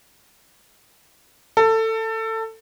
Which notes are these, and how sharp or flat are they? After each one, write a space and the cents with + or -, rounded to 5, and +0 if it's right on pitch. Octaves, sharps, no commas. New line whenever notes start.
A4 +20